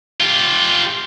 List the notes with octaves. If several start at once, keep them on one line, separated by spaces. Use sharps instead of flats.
F4 G4